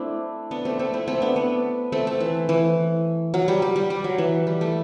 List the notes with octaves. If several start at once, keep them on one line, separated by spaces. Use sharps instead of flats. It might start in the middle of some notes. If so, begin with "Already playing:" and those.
Already playing: A3 C4 D4 E4
B3 D4
A3 C4
A3 C4
C4 E4
A3 C4
B3 D4
B3 D4
A3 C4
A3
E3
E3
F#3
G3
G3
G3
G3
F#3
E3
G3
A3